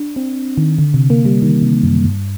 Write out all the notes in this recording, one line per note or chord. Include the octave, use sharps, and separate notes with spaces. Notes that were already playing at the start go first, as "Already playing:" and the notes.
Already playing: D4
C4
D#3
D3
C3
A#3
G3
D#3
C3
F#2
G2